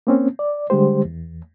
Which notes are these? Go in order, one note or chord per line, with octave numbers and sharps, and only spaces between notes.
A#3 C4 C#4
D5
D3 G3 G#3 G4 C5
E2